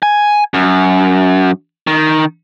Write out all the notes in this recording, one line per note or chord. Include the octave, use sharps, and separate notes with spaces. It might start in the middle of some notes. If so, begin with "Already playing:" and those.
G#5
F#2
D#3